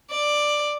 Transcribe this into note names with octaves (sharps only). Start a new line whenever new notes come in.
D5